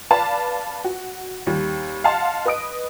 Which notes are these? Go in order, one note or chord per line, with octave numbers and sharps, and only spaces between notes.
B4 D5 F5 A5 B5
F#4
D#2 G3
D#5 F5 F#5 A5 C6
B4 D#5 D#6 D7